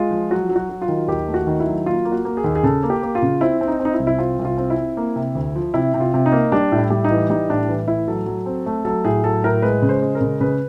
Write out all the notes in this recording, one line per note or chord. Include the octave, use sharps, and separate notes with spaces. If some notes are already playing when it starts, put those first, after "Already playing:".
Already playing: G#3 F4
F3
F#3 F#4
F#3
F#4
F#3
F4
D#3
D#2 G4
A3
F#4
D#3
E4
F#3
A#3 F4
A#3
F#4
A#3
G#4
D#2
G#4
C#3 A4
A#3
G4
A#3
F4
C#3
C4 E4
C4
D#4
C4
D#4
E4
C2
E4
C4 F4
C2
F4
C4
E4
C4
A#3
C3
D2
F3
C3 E4
C3
F4
C3
D#4
A#3
G3 D4
A2
E4
G3
D#4
E3
G3 D#4
A2 D4
E3
A2 E4
F#3 A4
F#3
C4
A3
F#3 A4
A2 G#4
F#3 A4
A2 A#4
G#3 B4
C#3
C5
G#3
A#4
C#3
C#3 B4